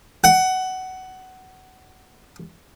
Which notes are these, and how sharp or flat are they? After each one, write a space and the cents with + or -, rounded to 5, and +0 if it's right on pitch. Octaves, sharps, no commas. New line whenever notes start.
F#5 +15